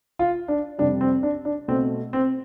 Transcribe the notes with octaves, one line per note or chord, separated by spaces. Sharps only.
F4
D4
F2 C3 G3 D4
C4
D4
D4
B2 A3 C4
C4